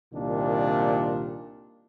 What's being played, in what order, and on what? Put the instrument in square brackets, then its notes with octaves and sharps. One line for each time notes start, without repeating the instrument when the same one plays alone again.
[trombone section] C2 A#2 D#3 D4